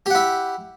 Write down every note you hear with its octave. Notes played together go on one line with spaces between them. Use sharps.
E4 G4 F#5